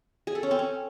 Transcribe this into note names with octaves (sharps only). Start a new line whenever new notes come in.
G#4
A4
C#4
C4
C#4